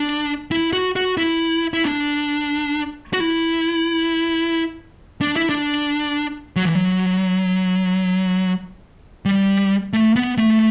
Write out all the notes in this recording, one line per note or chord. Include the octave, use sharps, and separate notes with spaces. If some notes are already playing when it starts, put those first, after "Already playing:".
Already playing: D4
E4
F#4
F#4
E4
E4
D4
F#4
E4
D4
E4
D4
F#3
E3
F#3
G3
A3
B3
A3